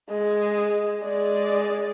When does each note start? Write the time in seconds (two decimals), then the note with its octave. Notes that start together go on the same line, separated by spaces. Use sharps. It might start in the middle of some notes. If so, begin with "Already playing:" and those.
0.10 G#3
1.03 G#3 D5